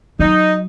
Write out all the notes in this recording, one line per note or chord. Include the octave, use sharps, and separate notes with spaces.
F#3 D#4